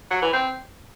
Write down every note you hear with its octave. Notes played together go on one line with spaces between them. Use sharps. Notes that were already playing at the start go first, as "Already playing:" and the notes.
F#3
E3
C4